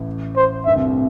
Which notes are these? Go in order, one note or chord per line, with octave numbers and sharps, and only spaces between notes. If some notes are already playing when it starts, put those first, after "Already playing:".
Already playing: A1 A2
C5
G2 E5
C2 C3
A2